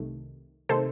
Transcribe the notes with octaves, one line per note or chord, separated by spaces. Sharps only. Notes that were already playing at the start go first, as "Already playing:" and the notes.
Already playing: C2 C3 D#3 A3
C3 D#3 A3 A4 C5